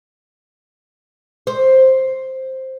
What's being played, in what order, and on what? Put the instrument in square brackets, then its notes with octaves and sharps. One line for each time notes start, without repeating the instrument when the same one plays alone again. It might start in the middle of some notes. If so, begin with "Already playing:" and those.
[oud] C5